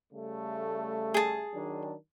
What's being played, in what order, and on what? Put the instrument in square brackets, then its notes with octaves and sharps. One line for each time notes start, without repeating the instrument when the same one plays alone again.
[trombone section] C#3 G3 A3
[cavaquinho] G#4 A5
[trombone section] D#3 F#3 D4